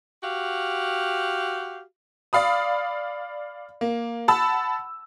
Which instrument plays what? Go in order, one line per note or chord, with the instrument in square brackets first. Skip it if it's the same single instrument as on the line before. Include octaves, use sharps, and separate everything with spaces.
[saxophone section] F#4 G4 F5
[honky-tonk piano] D5 F5 B5 D#6
A#3
F#5 A5 B5 E6